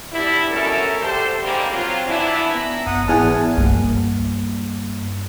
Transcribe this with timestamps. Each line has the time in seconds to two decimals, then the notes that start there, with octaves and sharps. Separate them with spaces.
0.12 G3 B3 D4 E4
0.51 B2 F#3 A3 C#4 A4 A#4
1.02 D3 A3 G4 A4 C5
1.42 G#2 D3 G3 A#3 C4
1.72 F#3 C4 F4
2.07 E3 B3 D4 E4
2.55 B3 A#5
2.87 G1 F#2 F#5 D#6
3.08 E2 G#2 F#5 G#5 A5 D#6 F6
3.57 G2 A#3